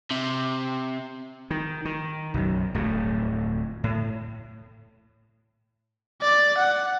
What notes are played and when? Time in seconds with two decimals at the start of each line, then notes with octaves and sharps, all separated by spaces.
0.11 C3
1.50 D#3
1.85 D#3
2.34 B1 F#2
2.75 D1 F2 A3
3.84 A2
6.21 D5
6.58 F#5